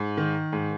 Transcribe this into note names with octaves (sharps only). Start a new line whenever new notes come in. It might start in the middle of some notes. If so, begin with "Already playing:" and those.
Already playing: G#2
D#3
G#2